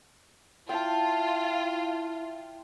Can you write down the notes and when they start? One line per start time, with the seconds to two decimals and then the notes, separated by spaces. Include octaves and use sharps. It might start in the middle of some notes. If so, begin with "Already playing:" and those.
0.69 E4 F4 G5 A5